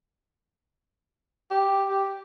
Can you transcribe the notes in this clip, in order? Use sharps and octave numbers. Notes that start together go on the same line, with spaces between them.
G4
G4